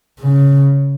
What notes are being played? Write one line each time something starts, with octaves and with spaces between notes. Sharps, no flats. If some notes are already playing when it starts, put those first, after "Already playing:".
C#3